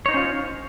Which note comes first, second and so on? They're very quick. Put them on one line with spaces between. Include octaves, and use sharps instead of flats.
C#5 D#4 C5 C#4 F4